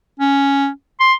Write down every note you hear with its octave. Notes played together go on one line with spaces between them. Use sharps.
C#4
C6